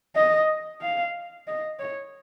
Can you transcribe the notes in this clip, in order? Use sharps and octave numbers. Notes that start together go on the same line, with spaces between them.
D#5
F5
D#5
C#5